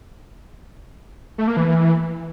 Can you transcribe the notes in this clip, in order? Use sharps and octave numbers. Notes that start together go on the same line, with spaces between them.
A3
A#3
E3